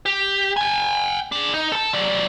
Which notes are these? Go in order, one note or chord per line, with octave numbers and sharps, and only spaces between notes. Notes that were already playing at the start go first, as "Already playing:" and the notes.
G4
G5 G#5
D4 G#4
D#4
A4 A5
F#3 D5